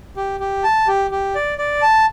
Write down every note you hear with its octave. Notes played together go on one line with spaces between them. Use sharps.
G4
G4
A5
G4
G4
D5
D5
A5